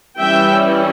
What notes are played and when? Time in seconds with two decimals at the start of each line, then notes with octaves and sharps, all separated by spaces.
0.19 E3 G3 C#4 E4 E5 G5